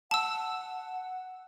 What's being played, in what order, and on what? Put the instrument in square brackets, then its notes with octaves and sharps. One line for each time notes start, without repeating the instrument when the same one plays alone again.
[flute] F#5 [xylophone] A5 E6